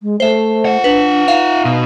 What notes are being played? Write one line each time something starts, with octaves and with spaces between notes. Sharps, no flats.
G#3
A3 C5 E5
F4 F#5
D4 B4
D#4 E5 F5
B2